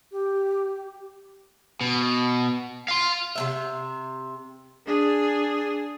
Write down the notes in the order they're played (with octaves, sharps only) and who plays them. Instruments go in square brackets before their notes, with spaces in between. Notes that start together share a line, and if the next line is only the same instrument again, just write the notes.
[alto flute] G4
[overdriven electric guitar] B2
F5 C6
[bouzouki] C3 A#3 E5
[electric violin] D4 G#4